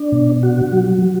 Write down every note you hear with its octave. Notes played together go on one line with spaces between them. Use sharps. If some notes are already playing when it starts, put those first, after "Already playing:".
Already playing: D4
B2
F#4
F#3
F#3